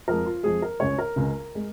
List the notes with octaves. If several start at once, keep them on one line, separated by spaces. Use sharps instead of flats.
F2 F3 G#3 A#4
F4
F2 F3 G#3 G#4
A#4
C#2 C#3 G#3 C#5
A#4
C#2 C#3 G#3
G#3